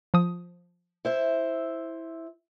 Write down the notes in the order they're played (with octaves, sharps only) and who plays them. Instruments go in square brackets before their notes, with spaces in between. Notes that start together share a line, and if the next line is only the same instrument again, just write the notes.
[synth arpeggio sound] F3 D#6
[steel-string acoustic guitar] E4 C5 E5